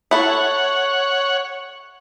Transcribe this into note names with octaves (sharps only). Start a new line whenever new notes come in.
E4 A4 C#5 F#5